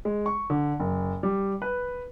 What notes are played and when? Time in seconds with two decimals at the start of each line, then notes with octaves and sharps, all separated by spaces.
0.05 G#3
0.26 C#6
0.50 D3
0.80 F#1
1.23 G3
1.62 B4